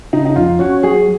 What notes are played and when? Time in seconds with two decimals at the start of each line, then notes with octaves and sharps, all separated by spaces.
0.13 C#3 D#4
0.25 D#4
0.36 F2 F4
0.59 C#4 F#4
0.83 F#3 G#4